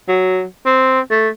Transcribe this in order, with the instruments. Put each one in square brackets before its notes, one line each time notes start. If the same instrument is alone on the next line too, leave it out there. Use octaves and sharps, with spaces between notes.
[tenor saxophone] F#3
C4
A3